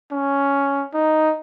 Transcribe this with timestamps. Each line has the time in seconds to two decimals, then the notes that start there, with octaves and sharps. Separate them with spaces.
0.11 C#4
0.94 D#4